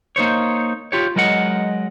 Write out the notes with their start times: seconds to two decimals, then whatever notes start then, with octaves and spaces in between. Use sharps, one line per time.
0.16 A#3 D#4 C5 C#5
0.92 F4 G4 C#5
1.16 F#3 G#3 A#4 D#5 F#5